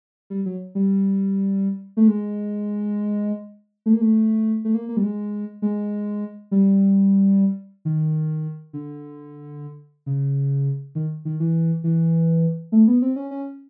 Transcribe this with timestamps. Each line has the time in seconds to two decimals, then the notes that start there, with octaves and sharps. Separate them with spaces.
0.30 G3
0.46 F#3
0.75 G3
1.97 A3
2.08 G#3
3.86 A3
3.93 A#3
4.01 A3
4.65 A3
4.75 A#3
4.89 A#3
4.97 G3
5.03 G#3
5.62 G#3
6.51 G3
7.85 D#3
8.73 D3
10.06 C#3
10.95 D#3
11.25 D#3
11.40 E3
11.84 E3
12.72 A3
12.88 B3
13.02 C4
13.16 C#4
13.31 C#4